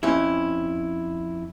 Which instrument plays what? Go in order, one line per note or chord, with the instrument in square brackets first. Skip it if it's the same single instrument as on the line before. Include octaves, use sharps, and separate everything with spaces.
[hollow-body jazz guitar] F2 C#4 E4